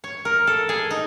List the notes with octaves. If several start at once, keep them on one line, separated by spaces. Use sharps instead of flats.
C#5
A#4
A4
G#4
D#4